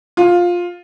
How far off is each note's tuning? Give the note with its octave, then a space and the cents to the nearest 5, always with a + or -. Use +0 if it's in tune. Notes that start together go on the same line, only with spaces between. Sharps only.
F4 +10